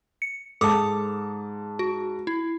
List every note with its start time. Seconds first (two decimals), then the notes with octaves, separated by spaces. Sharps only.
0.22 C#7
0.61 G#2 A4 A5 D6 D#6
1.79 F#4
2.27 E4